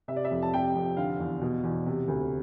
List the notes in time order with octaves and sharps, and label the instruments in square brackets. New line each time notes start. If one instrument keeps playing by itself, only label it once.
[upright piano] C3 E5
D5
E5
F2
A5
C3 G5
F2
D3 F5
E2
B2
E2
C3
D2